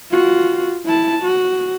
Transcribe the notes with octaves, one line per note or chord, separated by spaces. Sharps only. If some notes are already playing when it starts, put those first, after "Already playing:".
F4 F#4
E4 A5
F#4